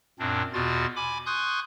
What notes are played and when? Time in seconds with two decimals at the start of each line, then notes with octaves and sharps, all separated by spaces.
0.19 F#2 A#2 C4 D4
0.53 E2 B2 F4 F#4 A6
0.96 G#5 B5 D6
1.26 G#5 C6 C#6 D#6 F#6 G6